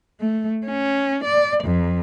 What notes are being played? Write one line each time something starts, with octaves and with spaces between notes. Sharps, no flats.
A3
C#4
D5
F2